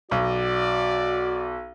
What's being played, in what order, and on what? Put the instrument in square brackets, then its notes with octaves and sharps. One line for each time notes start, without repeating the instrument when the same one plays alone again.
[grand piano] B1 [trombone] F#4 [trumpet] D5